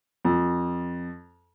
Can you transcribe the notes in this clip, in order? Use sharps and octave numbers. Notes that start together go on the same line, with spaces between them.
F2